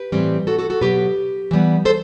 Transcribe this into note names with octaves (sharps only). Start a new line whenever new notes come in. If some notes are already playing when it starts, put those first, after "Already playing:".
Already playing: G4 B4
A2 E3 G3 C4
F#4 A4
F#4 A4
F#4 A4
B2 F#3 B3 G4 B4
E3 G3 B3
A4 C5